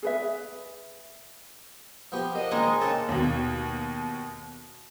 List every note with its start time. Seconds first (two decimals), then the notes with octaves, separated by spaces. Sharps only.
0.03 G#4 B4 E5
2.12 F3 B3 G4
2.35 A#4 C5 D5 D#5
2.51 A#2 D#3 G#3 D#4
2.81 C#3 A4 C#5 G5 D6
3.09 D#2 B2